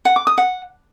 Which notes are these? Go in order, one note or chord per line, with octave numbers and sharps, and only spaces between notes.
F#5
D6
D#6
F#5